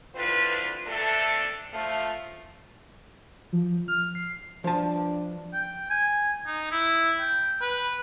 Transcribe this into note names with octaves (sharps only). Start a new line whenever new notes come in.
D3 E3 C4 F4 B4
C3 A3 D4 A4
F3 A3
F3
F6
C7
G2 F3 D4 A5
G5
G#5
D#4
E4
G5
B4